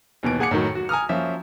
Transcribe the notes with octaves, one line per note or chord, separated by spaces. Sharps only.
D#2 B2 E3 D7
A#2 G#4 F#5 G#5 D6 C#7
A2 D#3 F#3
F#4
G#5 A#5 D#6 F6
F3 F#3 A#3 C#4 F#4 E5